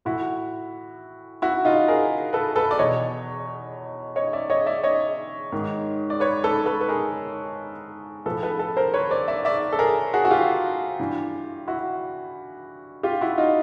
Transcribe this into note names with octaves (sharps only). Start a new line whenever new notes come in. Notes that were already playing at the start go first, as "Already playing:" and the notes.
A2 E3 E4 F#4
E4 F#4
D#4 F4
G#4 A#4
A4 B4
A4 B4
D5
E2 B2 C#5 D#5
C#5 D#5
D5 E5
C#5 D#5
D5 E5
C#5 D#5
G#2 D#3
D5
B4 C#5
A4 B4
A4 B4
B4
G#4 A#4
A2 F3 A4 B4
A4 B4
A4 B4
A#4 C5
B4 C#5
C5 D5
D5 E5
D5 E5
A4
G#4 A#4
F#4 G#4
F#4
F4 G4
G2 E3
E4 F#4
F4 G4
E4 F#4
D#4 F4